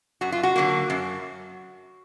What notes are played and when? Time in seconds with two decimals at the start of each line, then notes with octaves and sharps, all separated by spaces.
0.21 F#2 F#4
0.32 F4
0.43 F#4
0.56 D3 F#3 A#3
0.90 F#2